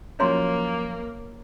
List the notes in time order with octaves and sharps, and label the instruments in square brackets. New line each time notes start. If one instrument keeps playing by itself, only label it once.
[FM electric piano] F3 F#3 C#4 [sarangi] A#3 [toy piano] C#5 A#5 C6